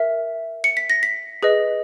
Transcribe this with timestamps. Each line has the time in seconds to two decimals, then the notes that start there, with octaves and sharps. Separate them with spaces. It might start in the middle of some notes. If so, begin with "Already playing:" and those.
Already playing: A#4 E5
0.64 C#7
0.77 B6
0.90 A#6
1.03 B6
1.43 G#4 B4 D#5